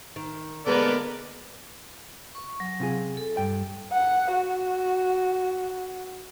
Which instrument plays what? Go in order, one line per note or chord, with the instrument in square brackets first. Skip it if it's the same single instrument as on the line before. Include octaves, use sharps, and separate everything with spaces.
[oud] D#3
[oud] D3 G#3 A#3 [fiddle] B3 [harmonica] A#4 D5
[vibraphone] C#6
F#3
[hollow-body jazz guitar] C3 F4 G#4
[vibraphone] A4
[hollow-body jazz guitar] G2 G5
[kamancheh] F#5
F#4